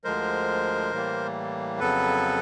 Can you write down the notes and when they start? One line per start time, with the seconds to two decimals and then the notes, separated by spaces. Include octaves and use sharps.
0.04 D2 D3 F3 G#3 A#4 C5
0.92 A2 E3 G3 A#3
1.80 F2 C#3 F#3 B3 A4 B4